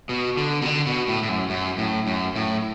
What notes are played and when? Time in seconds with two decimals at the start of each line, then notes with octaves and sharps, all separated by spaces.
0.09 B2
0.37 D3
0.62 B2
0.66 D3
0.87 B2
1.09 A2
1.23 A2
1.29 F#2
1.50 F#2
1.78 A2
2.07 F#2
2.36 A2